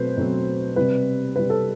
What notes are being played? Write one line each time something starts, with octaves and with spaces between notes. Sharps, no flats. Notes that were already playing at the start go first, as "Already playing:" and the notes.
Already playing: B2 F#3 A3 C4 B4 C5
B2 F#3 A3 C4
C3 G3 C4 B4
C3 G3 C4 B4
A4